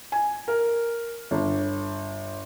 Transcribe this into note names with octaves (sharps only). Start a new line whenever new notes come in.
G#5
A#4
G1